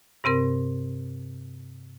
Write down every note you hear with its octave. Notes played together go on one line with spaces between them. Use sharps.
G2 C3 C4 A#4